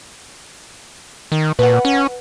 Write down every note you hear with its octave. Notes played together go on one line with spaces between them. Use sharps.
D#3
A#2 B4 F#5
C#4